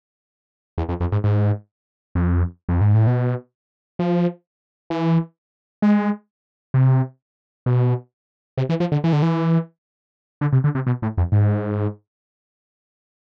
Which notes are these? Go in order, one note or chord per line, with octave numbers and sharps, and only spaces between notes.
E2
F2
F2
G#2
G#2
F2
F2
G#2
A2
B2
F3
E3
G#3
C3
B2
C3
E3
F3
D3
E3
D3
E3
D3
C3
D3
C3
B2
A2
F2
G#2